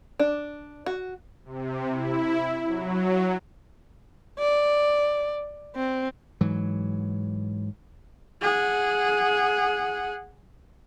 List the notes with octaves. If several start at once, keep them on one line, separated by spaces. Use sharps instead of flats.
D4
F#4
C3
E4
F#3
D5
C4
G#2 E3 F#3
G#4 F#5